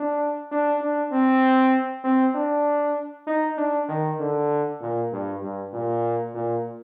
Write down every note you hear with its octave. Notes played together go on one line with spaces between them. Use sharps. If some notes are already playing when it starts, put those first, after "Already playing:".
Already playing: D4
D4
D4
C4
C4
D4
D#4
D4
D#3
D3
A#2
G2
G2
A#2
A#2